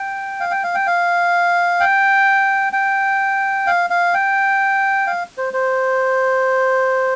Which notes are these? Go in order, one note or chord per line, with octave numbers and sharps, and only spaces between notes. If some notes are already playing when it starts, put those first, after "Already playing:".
Already playing: G5
F5
G5
F5
G5
F5
G5
G5
F5
F5
G5
F5
C5
C5